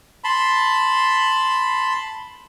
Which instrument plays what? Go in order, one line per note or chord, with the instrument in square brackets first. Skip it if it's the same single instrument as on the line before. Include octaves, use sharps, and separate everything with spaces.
[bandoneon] A5 B5 C6